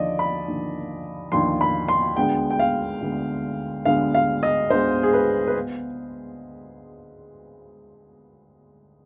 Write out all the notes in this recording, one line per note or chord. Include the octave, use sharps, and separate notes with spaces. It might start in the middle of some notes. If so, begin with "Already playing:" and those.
Already playing: D#2 D3 F3 D5 D#5
B5
D#2 D3 F3
D#2 D3 F3 C6
B5
C6
D2 D3 G#3 B3 G5
G5
F5
D2 D3 G#3 B3
D2 D3 G#3 B3 F5
F5
D#5
D2 D3 G#3 B3 C5
G#4
B4
B4
B3